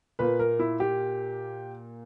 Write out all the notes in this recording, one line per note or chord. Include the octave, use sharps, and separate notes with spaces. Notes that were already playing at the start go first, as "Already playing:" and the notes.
A#2 A#3 B4
A#4
E4
G4